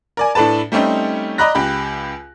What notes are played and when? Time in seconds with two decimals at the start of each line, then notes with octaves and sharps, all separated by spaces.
0.17 A#4 D5 G#5
0.35 A2 D4 A4 B4 A5
0.72 G3 A3 C4 C#4 D#4
1.38 D5 D#5 A#5 B5 F#6 A#6
1.55 C#2 G4 B5